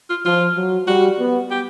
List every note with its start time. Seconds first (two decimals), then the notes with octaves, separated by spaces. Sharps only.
0.10 F4
0.25 F3 F4
0.56 F#3
0.87 G3 F#4
1.19 B3
1.51 G4